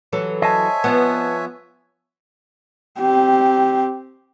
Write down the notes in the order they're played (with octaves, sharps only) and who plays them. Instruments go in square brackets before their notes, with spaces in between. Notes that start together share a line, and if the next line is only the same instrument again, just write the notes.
[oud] E3 F#3 A4
[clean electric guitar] C5 D#5 A5 [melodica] C#5 E5 G#5
[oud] F3 B3
[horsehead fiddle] C4 G4